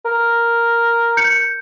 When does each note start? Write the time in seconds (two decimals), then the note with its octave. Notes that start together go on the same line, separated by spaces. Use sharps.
0.05 A#4
1.17 G6 C#7